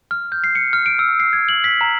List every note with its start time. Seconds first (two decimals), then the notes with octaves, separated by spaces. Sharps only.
0.11 F6
0.32 G6
0.44 C7
0.55 C#7
0.73 F6
0.86 D7
0.99 E6
1.20 C7
1.33 G#6
1.49 F#7
1.64 B6
1.81 A#5